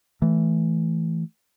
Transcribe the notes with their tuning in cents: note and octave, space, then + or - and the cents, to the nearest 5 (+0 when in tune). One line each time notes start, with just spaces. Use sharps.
E3 +0 A3 +0